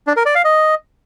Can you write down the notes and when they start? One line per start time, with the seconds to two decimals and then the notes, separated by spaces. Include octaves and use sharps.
0.07 D4
0.17 A#4
0.26 D5
0.35 F5
0.44 D#5